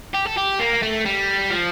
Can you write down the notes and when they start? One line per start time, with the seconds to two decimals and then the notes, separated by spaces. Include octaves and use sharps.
0.15 G4
0.27 A4
0.38 G4
0.60 A#3
0.83 A3
1.06 G3
1.50 F3